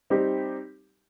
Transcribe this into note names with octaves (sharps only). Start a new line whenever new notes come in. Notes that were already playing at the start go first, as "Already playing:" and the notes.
G3 C4 D#4 G4